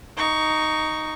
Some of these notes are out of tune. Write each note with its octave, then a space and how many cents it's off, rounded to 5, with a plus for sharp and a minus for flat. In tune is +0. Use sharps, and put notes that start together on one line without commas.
D#4 +0 C#6 +20